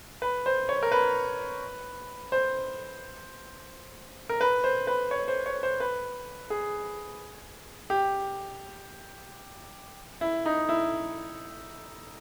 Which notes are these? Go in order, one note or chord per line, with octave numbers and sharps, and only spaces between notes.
B4
C5
C#5
A#4
B4
C5
A#4
B4
C5
B4
C#5
C5
C#5
C5
B4
G#4
G4
E4
D#4
E4